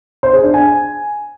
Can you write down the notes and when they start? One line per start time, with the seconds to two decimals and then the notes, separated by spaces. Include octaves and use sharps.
0.23 C5
0.33 G#4
0.44 D4
0.54 G#5